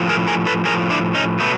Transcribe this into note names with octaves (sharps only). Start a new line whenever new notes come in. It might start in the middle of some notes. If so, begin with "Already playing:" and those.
Already playing: A2 F3
G#4 A#4
G#4 A#4
A4 B4
A2 F3 G#4 A#4
D4 E4
C#4 D#4
B2 F#3 A3 B3